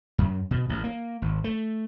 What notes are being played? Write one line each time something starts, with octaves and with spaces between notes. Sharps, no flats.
F#2
B2
A1
A#3
G#1
A3